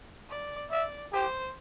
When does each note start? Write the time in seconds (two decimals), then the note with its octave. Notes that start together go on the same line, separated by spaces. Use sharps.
0.29 D5
0.71 D5 E5
1.13 G4 C5